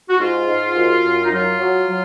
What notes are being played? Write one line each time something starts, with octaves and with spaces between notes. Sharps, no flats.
F#4
G#2 F4
G#2
F#2
F#2
D#4
F#3 F4
F#3
F#3